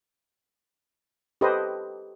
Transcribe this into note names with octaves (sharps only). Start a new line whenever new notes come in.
G4 A4 B4 C5 D#5